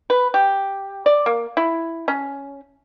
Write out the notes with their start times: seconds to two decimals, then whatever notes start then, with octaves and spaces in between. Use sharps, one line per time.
0.10 B4
0.34 G4
1.06 D5
1.26 A#3
1.57 E4
2.08 C#4